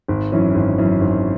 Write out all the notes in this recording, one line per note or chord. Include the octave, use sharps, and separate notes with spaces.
G#1
F#2 E3 C#4
G#1
F#2 E3 C#4
G#1